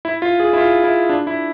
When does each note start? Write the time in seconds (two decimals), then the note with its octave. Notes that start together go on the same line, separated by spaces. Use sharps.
0.05 E4
0.22 F4
0.40 G#4
0.53 E4
0.57 F4
0.84 E4
1.09 D4
1.27 E4